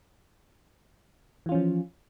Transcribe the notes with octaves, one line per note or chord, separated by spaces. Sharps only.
E3 F3 C#4 F4